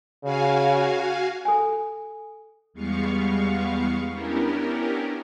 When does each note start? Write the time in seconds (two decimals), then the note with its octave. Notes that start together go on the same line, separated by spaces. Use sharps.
0.24 C#3 F#4 F5 G#5
1.45 A4 G#5
2.74 E2 G3 G#3 B3 F5 C#6
4.12 B3 C#4 D4 E4 G4 A#4